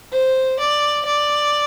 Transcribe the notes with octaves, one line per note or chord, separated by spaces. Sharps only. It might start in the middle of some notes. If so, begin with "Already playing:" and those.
C5
D5
D5